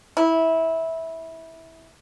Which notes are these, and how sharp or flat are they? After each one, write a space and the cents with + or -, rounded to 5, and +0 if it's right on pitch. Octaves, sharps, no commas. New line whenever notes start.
E4 -15